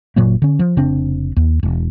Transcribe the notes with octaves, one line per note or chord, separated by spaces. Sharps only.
F#1 A#2 F#3 A#3
D3 C#4
F3
F1 C#3 C4 D4
D#2
E1